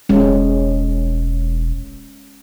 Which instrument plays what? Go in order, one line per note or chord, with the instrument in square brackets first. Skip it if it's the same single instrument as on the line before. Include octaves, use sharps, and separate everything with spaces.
[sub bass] E1 [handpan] G#3 C#4